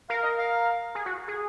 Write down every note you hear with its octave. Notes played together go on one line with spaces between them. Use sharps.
A#4 F5
D#5
F5
G#4
F#4
G#4